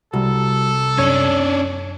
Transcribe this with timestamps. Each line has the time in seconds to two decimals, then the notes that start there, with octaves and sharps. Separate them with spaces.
0.14 C2 G3 F#4 A4
0.98 F#2 C#4 D4 C#5 G#6